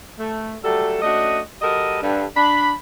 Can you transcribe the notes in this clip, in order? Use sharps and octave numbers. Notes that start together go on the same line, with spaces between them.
A3
F#3 G3 A3 A4
A3 C#4 D4 F#4 D#5
G3 F#4 A4 A#4 D#5
G2 D3
D4 B5